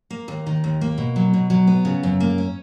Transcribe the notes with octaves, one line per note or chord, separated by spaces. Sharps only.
A#3
D#2
D#3
D#2
A#3
B2
F#3
B2
F#3
B3
C#3
F#2
A#3
C#4